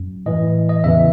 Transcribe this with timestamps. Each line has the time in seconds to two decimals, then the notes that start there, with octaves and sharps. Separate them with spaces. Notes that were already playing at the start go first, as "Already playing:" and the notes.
Already playing: F#2
0.26 A2 E3 D#5
0.69 D#5
0.84 E2 C#3 E3 E5